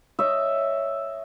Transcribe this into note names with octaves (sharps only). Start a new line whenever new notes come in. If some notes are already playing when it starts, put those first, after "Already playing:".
C#5 D#5 E5